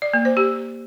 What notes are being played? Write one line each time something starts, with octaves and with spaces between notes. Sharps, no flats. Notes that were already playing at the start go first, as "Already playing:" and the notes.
D5
A#3
C5
G4